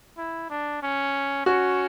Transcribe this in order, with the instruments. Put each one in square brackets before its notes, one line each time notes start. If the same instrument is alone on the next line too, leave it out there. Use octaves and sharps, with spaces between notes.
[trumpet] E4
D4
C#4
[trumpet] C#4 [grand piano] F#4